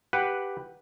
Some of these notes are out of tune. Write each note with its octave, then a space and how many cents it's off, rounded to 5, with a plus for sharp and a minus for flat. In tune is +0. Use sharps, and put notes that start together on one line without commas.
G4 +0 B4 +0 F#5 +0